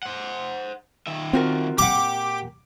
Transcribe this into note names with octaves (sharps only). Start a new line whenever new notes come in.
C5 F#5
D#3 E5
C4 F4 F#4 A#4
A#2 G4 F#5 D6